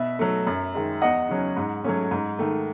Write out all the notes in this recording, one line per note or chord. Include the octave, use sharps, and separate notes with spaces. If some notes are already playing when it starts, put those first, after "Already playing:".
Already playing: B2 E5
F#3 A3
F#2
D#3 G#3
E2 D#5 F#5
C#3 F#3 C#4
G#2
F#3 A3 C#4
G#2
D#3 A3